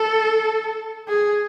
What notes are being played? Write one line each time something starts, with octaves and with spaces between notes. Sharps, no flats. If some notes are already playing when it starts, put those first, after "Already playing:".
Already playing: A4
G#4